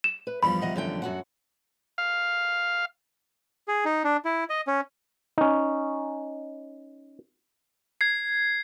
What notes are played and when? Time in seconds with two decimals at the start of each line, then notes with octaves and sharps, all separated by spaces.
0.04 E7
0.27 B4
0.43 E2 G2 F3 G3 B5
0.61 D#3 D#5 F#5
0.76 F#2 D3 G5
1.02 F#2 F#4 F#5
1.98 F5
3.68 G#4
3.85 D#4
4.04 D4
4.25 E4
4.50 D#5
4.67 C#4
5.38 C#4 D#4
8.01 G#6 C7